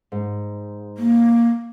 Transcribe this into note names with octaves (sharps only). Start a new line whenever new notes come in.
G#2
A#3